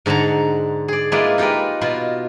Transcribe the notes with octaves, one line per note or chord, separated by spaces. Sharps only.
G#2 D3 F#5 A5 A#5
G#4 D5
G#3 A#3 E4 F4 B4 D5
D#4 F4 G4 A#4 B4
B2 F4 B5